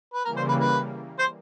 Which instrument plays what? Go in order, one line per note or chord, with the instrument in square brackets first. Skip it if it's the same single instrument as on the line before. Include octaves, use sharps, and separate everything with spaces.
[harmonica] B4
[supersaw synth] C#3 E3 G3 A#3 [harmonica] A#4
[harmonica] C5
B4
B4
C5